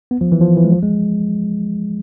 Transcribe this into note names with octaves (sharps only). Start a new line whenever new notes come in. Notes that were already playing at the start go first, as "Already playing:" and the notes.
B3
F3
E3
F3
E3
G#3
F3
G#3